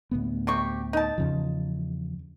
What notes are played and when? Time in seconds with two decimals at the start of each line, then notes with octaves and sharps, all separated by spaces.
0.11 D2 A2 B3
0.47 C3 G4 C#6
0.93 D#4 A5
1.18 E2 C#3 F3